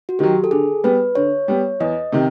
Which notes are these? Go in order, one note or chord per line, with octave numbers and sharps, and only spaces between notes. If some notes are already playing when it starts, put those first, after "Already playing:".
F#4
D#3 F#3 G4
A4
D3 G#4
G3 B3 B4
D3 C#5
G3 B3
E2 D#5
C3 D#3